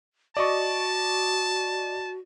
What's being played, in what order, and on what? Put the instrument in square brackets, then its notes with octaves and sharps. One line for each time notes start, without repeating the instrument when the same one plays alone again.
[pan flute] F#4 [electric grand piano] D5 D#5 C#6 [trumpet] A5